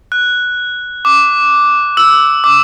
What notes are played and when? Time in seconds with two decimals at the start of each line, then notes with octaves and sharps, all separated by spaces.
0.12 F#6
1.05 D6
1.97 E6
2.44 D6